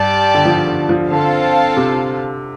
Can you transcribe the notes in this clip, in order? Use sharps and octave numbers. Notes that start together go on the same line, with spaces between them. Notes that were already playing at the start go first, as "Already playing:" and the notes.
Already playing: G2 G4 D5 A5
D3
F3
D3
F3
D3 C4 F4 A4 F5 A5
C3